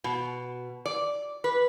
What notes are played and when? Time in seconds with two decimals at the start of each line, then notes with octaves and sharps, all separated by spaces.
0.04 B2
0.86 D5
1.44 B4